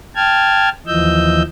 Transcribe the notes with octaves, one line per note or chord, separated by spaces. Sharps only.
G5 A5 F6 G#6
D#2 E3 F3 D#5 E6 G6